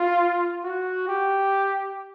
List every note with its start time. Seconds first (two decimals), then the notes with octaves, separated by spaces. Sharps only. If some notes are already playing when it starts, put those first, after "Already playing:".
Already playing: F4
0.63 F#4
1.08 G4